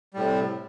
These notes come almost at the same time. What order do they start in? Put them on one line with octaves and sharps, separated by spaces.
G3 A2 C3